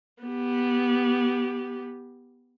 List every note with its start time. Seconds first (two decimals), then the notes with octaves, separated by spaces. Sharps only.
0.23 B3 G4